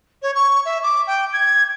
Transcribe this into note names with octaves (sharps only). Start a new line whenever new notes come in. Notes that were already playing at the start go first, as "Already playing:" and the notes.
C#5
C#6
E5
D6
G5
G#6